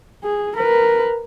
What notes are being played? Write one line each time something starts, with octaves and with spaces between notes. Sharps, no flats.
G#4
A#4 B4